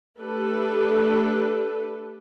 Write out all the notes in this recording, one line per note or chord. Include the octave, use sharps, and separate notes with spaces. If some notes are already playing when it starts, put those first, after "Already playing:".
A3 D4 G4 A4 B4